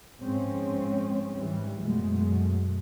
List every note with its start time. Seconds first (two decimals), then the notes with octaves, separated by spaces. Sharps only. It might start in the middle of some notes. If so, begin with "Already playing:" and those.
0.21 G#2 F3 G#3 C4 C#4
1.38 G#2 E3 G3
1.78 F#2 B2 G#3 A3